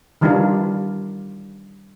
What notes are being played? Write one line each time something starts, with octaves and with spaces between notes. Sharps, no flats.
D#3 E3 G3 D4 D#4 F4